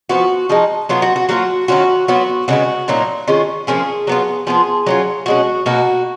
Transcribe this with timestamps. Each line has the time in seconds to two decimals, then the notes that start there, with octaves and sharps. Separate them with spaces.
0.09 F3 B3 F4 F#4
0.49 F3 G#3 D#4
0.89 F#3 B3 D#4 F4
1.02 F#4
1.16 F#4
1.29 F#3 A#3 F4 F#4
1.68 D#3 F#3 C#4 F4 F#4
2.08 F#3 B3 F4 F#4
2.48 C#3 G#3 B3 F#4
2.88 A#2 F#3 A#3 D#4
3.28 D#3 G#3 C#4 F4
3.67 F3 A#3 C#4 F4 G#4
4.07 F#3 B3 F4
4.47 F3 B3 F4 G#4
4.86 F#3 C#4 F4
5.26 B2 G#3 C#4 F#4
5.66 B2 A#3 D#4 F#4